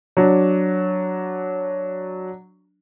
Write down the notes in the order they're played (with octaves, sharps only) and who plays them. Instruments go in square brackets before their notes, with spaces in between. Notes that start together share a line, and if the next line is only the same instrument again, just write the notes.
[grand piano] F#3 D4